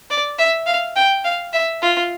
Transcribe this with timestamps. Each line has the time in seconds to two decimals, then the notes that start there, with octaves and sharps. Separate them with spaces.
0.10 D5
0.39 E5
0.67 F5
0.96 G5
1.25 F5
1.53 E5
1.82 F4